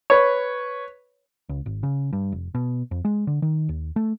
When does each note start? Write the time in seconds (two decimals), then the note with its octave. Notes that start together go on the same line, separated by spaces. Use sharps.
0.10 B4 C#5
1.49 C#2
1.66 G#1
1.83 C#3
2.13 G2
2.32 F1
2.55 B2
2.91 F2
3.05 G#3
3.27 D3
3.42 D#3
3.69 D#2
3.96 A3